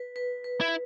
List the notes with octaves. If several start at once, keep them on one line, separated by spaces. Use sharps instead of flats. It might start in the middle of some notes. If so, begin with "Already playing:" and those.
Already playing: B4
B4
B4
E4